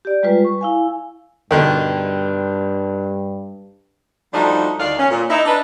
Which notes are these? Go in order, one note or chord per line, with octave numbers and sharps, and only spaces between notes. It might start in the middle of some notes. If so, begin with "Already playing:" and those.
G4 D5
G3 G#3 F4 B4
C#6
E4 F5 G#5
G2 B2 D3 D#3
F3 G3 A3 D4 D#4 F#4
D2 D#3 D4 F5
C#4
A#2
D#4 E4
D4 D#4 B4